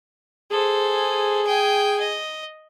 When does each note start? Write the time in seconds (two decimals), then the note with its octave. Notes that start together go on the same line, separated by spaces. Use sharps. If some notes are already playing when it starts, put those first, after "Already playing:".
0.51 G#4 A4 C5
1.47 G5 G#5
2.00 D#5